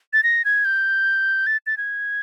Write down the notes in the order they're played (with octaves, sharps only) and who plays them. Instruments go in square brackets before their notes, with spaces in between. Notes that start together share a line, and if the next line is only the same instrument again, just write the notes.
[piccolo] A6
A#6
G#6
G6
A6
A6
G#6